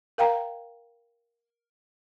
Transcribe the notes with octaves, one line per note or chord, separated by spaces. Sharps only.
A#4 F5 G5 A#5